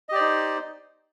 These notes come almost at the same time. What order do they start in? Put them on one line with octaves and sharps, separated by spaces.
D#5 G4 D5 C5 D#4